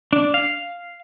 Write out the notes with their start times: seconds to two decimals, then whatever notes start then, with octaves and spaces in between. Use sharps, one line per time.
0.13 D4
0.34 F5